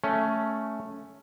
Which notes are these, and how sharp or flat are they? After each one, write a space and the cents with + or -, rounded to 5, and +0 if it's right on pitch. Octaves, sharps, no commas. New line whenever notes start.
A3 +0 C#4 +5